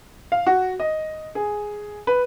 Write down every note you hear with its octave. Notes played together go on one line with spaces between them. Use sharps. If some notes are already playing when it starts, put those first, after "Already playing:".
F5
F#4
D#5
G#4
B4